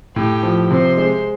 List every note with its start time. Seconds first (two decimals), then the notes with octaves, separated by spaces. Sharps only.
0.16 A2 G4
0.43 F3
0.70 C3 C5
0.97 G#3